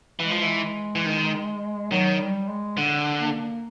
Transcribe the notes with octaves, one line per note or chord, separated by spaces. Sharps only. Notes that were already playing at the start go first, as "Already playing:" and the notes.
E3 G#3
F3
E3
E3
D#3
D#3 F#3
G3
G#3
D3
A#3